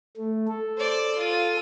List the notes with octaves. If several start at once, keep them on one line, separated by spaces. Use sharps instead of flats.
A3
A4
C5 D5
F4 D#7